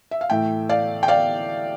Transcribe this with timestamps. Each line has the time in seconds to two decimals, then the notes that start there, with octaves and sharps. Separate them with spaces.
0.11 E5
0.21 F5
0.30 A2 E3 A3 E5 G5
0.69 D5 F5
1.03 G5
1.08 D5 F5